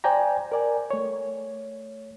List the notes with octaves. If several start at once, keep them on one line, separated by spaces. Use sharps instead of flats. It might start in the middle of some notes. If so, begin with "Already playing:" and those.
C5 D5 G5 G#5 A#5
A#4 D5 G#5
A3 C#5